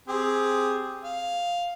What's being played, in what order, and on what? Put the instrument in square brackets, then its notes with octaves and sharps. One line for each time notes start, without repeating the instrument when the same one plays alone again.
[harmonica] C4 G4 G#4
F5